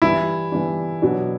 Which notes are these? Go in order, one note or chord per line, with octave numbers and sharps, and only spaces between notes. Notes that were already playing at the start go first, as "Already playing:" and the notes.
G2 E3 G3 D4 E4
G2 E3 G3 D4
B2 F#3 B3 D4